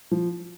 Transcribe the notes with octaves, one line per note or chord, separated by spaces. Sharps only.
F3